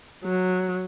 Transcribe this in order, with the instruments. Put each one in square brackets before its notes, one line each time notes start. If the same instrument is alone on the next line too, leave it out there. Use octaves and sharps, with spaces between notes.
[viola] F#3